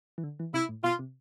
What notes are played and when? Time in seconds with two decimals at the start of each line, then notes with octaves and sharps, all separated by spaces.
0.18 E3
0.24 D3
0.40 E3
0.54 C3 E4
0.69 A2
0.84 B2 F4
0.99 C3